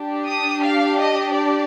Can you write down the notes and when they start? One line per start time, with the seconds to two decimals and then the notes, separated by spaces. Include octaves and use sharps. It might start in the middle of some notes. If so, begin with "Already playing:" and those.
Already playing: D4 G4
0.27 D#6
0.63 F5
0.99 D#5
1.36 D5